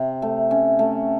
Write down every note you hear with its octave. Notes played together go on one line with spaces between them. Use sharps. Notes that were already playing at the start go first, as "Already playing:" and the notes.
Already playing: C3
A3
C#4
A3